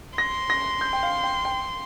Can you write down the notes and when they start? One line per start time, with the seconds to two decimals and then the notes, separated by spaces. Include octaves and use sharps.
0.18 C6 A#6
0.50 A#6
0.81 G6
0.93 G5
1.03 F5
1.23 G5
1.45 G5